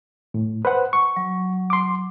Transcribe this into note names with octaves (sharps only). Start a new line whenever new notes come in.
A2
B4 C5 F#5
C#6
F#3
C6 D6